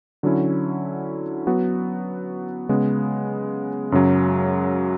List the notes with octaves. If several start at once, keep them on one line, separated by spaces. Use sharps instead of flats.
D3 F#3 C#4 E4
F#3 B3 F#4
C#3 G#3 B3
F#2 C#3 F#3